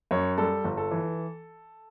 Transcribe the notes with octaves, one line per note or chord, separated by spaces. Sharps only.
F#2 C#5
G3 A4
G1
A4
E3